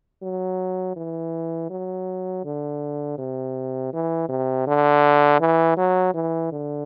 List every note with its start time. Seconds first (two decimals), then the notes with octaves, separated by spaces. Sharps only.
0.23 F#3
0.96 E3
1.70 F#3
2.45 D3
3.18 C3
3.93 E3
4.29 C3
4.67 D3
5.41 E3
5.77 F#3
6.15 E3
6.52 D3